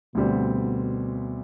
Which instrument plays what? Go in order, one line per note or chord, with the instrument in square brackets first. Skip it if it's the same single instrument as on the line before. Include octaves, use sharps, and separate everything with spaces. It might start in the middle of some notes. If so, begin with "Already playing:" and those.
[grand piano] D2 D3 G3 C4 [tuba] B2